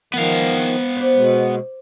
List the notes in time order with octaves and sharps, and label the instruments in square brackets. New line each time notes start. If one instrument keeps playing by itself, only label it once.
[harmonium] D#3 F3 [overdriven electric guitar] B3 F5
[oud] C4
C5 D5
[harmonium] B2 G#3